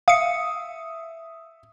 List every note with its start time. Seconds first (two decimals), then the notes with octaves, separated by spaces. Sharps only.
0.08 E5 F5 D#6 C#7